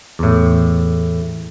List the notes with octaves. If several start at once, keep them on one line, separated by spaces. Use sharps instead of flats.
E2 A2